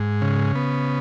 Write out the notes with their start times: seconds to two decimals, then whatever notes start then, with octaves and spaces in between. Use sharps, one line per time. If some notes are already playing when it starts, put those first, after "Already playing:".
Already playing: G#2
0.22 C#3
0.55 B3